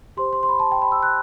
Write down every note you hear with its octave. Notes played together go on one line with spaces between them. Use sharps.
G4 C5 C6
C6
C6
B5
A5
G5
B5
E6
F#6